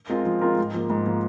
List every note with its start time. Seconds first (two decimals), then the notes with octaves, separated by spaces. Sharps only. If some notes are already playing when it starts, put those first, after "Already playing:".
0.10 G#3 C4 F4 A#4
0.25 F3
0.41 G#3 C4 F4 A#4
0.59 G#2
0.74 F3 A#3
0.90 G#2
1.06 F3 A#3